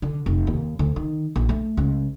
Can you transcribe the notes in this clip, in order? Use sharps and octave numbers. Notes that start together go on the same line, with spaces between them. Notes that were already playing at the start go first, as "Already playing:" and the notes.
D3
F1
D#2
D2
D#3
A#1
A3
C#2